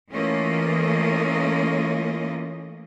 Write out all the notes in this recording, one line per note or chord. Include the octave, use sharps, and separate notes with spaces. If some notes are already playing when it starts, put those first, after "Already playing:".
E3 A3 A#3 C#4 F4 D#5